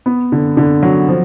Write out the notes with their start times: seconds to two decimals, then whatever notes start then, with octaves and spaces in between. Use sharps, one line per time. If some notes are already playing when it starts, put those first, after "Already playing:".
0.06 B3
0.32 D3
0.57 D3
0.83 F#3
1.08 F3